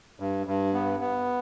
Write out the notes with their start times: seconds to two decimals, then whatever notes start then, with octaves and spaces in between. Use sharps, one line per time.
0.20 G2
0.47 G2
0.74 B3
1.00 B3